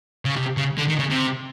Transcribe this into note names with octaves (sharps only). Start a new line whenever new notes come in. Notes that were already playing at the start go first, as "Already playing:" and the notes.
C#3
C3
C#3
D3
D#3
C#3
C3